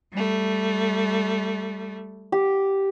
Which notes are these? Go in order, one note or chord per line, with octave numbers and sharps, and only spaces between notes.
G3 A3
G4